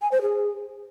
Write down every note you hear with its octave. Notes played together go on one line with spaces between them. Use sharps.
G#5
C5
G#4